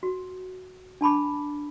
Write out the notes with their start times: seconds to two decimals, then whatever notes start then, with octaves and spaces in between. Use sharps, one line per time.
0.03 F#4
1.01 D4 A5 B5 D6